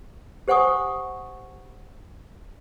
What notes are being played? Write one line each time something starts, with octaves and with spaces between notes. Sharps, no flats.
G4 C5 F#5 G#5 C#6 D#6